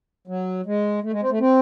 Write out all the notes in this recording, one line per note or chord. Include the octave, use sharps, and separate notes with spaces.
F#3
G#3
A3
G#3
C4
A3
C4